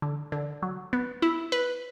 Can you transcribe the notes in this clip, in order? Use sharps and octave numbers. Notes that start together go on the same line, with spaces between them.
D3
D3
F#3
B3
E4
B4